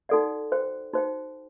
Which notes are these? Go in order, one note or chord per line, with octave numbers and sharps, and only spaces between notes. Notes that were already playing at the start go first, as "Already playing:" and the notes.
D#4 F#4 A4 D5 F#5
F#4 C5 G5
D#4 F#4 C5 G5